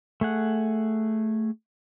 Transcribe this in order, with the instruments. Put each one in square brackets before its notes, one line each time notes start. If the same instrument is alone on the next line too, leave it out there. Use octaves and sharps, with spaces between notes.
[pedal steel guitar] A3 G#4 F#5